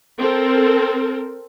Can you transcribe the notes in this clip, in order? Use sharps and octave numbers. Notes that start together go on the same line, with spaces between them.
C4 A4 A#4